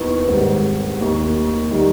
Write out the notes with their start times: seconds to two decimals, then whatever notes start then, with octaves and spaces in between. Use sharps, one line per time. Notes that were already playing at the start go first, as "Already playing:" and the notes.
Already playing: D#2 D#3 B3 E4
0.28 G#1 G#2 G3
1.00 D#2 D#3 A#3
1.71 D#3 G3 A#3 D#4